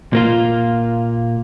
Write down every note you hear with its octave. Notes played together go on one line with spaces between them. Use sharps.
A#2 A#3 F4